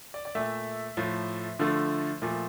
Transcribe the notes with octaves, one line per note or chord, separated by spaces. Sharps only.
D5
D5
A#2 A3 E5
A2 F3 A3
D3 F3 A3
A#2 F3 A3